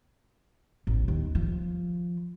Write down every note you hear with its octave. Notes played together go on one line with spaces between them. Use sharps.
A1
D#2
F3